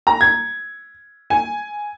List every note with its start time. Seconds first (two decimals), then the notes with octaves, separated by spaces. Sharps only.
0.07 A#5
0.21 G#6
1.30 G#5